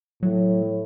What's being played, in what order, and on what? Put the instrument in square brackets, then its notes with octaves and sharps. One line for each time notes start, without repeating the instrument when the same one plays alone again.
[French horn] A2 [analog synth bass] F#3